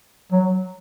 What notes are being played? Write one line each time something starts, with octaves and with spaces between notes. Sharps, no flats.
F#3